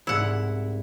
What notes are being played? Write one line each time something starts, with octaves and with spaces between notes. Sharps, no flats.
C2 G#2 E4 F#5